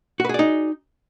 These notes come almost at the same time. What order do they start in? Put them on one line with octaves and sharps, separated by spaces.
F#4 B4 G#4 D5 D#4